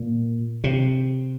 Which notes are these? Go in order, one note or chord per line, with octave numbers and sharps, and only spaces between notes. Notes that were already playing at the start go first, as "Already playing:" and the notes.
Already playing: A#2
C3